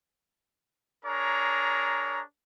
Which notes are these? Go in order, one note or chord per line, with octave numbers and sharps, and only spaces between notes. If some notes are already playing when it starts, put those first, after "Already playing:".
D4 G#4 A#4 C#5 A#5